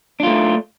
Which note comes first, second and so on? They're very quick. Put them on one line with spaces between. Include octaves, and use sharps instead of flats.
D4 F4 A3